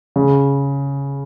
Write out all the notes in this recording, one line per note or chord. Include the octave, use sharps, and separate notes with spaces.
C#3